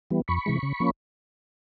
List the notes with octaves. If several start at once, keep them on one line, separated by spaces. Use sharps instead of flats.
E3 G3 B3
F2 B5 C#6
C3 E3 G#3
C#3
F3 A#3 C#4